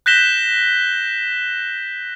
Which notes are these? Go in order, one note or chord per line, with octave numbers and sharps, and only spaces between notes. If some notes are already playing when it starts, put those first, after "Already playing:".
F#6 G6 A#6 B6 E7 G7